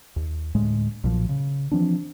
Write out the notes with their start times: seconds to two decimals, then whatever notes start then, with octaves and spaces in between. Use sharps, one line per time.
0.16 D#2
0.54 D2 A2 G#3
1.04 B1 A#2 F3
1.29 C#3
1.71 E3 F3 C4 D4